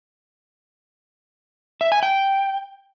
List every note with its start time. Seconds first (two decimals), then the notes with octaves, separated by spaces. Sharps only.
1.81 E5
1.92 G#5
2.03 G5